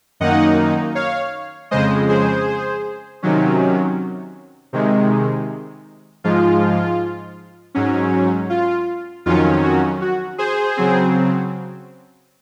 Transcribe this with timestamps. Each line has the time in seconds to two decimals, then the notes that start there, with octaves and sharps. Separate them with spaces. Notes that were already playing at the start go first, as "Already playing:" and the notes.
0.20 F#2 D#3 A#3 D#4 D#5 F#5
0.95 C#5 F5
1.71 F2 C#3 G#3 C5 D#5
2.09 G#4 C5
3.23 C3 D#3 F#3 C#4
4.73 C3 D#3 G#3
6.24 G#2 F3 G#3 F4
7.75 G#2 F#3 C#4
8.50 F4
9.26 F2 D#3 F#3 C#4 F4
9.63 F#4
10.02 F#4
10.38 G#4 C5
10.77 C#3 F#3 C4